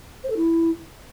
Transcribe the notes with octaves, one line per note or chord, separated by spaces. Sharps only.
C5
A4
E4